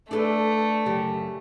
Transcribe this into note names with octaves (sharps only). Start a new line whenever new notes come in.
A3 D4 A4 B4
F#2 C#3 G4